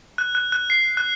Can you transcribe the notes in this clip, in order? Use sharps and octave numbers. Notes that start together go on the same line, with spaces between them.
F#6
F#6
F#6
C7
F#6